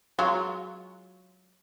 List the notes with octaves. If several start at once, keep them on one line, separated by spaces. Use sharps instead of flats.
F#3 G#3 F4